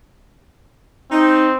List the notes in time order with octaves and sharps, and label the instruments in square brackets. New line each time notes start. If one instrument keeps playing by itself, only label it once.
[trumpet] C4 [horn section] D#4